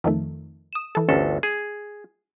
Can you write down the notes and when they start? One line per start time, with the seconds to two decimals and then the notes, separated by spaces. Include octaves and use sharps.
0.04 F2 D#3 A3
0.73 D#6 E7
0.95 E3 A4
1.09 G1 D2 C#4 A4
1.43 G#4